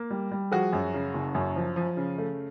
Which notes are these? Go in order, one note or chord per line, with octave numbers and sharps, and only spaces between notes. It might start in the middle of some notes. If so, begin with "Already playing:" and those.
Already playing: A#3
G3
G3
F3 F#4 G#4
F#2
C#3
F#1
F#2
F3
F3
C#3
A3